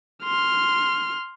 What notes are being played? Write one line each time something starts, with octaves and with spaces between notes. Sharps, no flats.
C6 F6